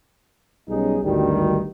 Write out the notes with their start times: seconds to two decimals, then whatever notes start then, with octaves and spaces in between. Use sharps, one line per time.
0.68 B1 G3 C#4 D#4 G#4
1.04 G#1 D2 G2 D#3 G3